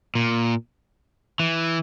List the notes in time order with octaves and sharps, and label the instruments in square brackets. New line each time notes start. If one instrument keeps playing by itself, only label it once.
[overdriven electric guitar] A#2
E3